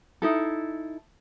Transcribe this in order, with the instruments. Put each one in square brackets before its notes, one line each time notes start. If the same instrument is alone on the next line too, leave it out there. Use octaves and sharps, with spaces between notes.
[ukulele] D#4 E4 A4